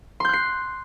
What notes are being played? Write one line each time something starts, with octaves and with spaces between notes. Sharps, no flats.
C6 F#6 G6 C7